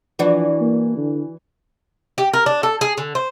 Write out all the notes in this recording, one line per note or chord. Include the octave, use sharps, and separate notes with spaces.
E3 F3 D4 F#4
A#3
D3
G4
A#4
D4
A4
G#4
D3
C5